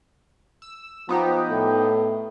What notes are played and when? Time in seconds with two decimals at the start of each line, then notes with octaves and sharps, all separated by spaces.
0.62 E6
1.09 F3 B3 D#4 G4
1.49 A2